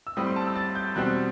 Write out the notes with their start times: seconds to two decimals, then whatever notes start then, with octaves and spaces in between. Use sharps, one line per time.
0.07 E6
0.17 A2 G3 C4 D#6
0.26 C6
0.36 A5
0.46 E6
0.56 A6
0.75 G6
0.95 E2 B2 G3 C4 F#6